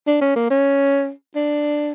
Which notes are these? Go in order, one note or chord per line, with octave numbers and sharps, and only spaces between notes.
D4
C#4
A#3
C#4
D4